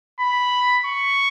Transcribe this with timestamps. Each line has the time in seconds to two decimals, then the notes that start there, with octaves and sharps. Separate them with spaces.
0.20 B5
0.86 C#6